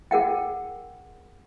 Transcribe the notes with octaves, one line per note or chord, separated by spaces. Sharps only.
G#4 A#4 F#5 G5